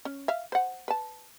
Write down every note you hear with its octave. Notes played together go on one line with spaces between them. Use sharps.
C#4
E5 F5
C5 F#5
B4 A5